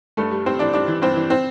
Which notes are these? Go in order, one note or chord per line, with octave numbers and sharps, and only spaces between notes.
G2 A3 A4
G3
G3 C4 C5
E3 D4 D5
G3 D4 D5
E3
G2 C4 C5
E3
C4 C5